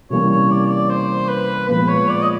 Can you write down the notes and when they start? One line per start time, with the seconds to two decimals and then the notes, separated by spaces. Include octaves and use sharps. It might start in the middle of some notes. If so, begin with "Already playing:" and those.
0.10 C3 E3 G3 A#3 C#4 C#5
0.30 C#5
0.50 D5
0.64 C#5
0.70 D5
0.89 C5
1.29 B4
1.68 A#2 F3 G#3 B3 B4
1.89 C#5
2.09 D5
2.23 D#5